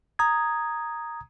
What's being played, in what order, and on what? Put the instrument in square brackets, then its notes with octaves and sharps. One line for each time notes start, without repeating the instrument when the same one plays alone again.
[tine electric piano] A#5 D#6 G#6